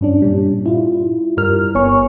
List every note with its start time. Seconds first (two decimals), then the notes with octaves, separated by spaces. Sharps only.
0.01 G2 C#4 D4
0.22 A#2 G3
0.66 E4 F4
1.37 G2 G3 A#4 F6
1.75 G1 B3 C#5 G#5 C#6